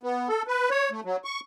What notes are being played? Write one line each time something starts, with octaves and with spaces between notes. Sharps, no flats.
B3
A4
B4
C#5
A3
F#3
C#6